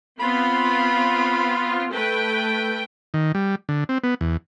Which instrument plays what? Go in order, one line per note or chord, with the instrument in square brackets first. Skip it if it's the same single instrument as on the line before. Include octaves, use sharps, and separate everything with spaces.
[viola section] B3 C4 F4 [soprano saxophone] B5
[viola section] A3 B4 G5
[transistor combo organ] D#3
G3
D3
C4
B3
E2